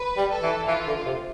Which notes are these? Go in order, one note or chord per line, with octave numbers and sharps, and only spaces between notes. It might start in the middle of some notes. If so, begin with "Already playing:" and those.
Already playing: B4
G3
A4
E3
E3 F4
D3
C3